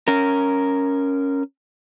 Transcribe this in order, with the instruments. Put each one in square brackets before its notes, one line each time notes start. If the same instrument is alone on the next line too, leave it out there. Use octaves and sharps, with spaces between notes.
[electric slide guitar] C#4 A#4